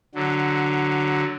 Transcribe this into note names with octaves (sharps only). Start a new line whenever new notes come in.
D3 F#3